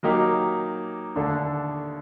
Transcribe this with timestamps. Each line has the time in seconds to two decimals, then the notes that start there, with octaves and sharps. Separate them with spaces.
0.03 F#3 A#3 D#4 G4
1.16 D#2 D3 A3 D4 A4